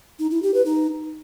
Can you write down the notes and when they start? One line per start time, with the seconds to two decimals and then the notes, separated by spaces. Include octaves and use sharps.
0.19 D#4
0.31 E4
0.42 G4
0.54 B4
0.66 D#4